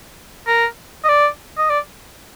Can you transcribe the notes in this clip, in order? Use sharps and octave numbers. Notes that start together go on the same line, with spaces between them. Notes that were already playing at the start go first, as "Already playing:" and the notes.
A#4
D#5
D5
D#5
D5